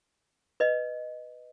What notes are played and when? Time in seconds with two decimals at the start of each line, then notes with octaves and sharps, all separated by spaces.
0.60 B4 D#5